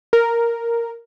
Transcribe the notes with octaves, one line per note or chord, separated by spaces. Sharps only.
A#4